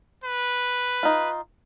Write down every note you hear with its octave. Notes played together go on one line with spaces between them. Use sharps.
B4
D#4 F4